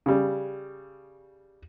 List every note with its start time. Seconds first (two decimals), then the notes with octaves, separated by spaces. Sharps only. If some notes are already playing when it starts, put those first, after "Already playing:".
0.06 C#3 G3